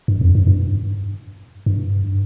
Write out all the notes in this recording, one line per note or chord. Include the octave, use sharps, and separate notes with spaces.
G2
F2
G2
G2
G2